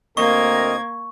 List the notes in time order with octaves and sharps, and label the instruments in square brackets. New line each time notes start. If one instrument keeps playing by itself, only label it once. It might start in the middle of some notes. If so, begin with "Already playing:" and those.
[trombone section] D2 C4 A#4 [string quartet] A#3 G#6 [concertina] D#5 [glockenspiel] C#6